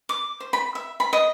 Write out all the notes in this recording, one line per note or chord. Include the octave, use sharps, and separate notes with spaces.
D6
C5
B5
E5
B5
D#5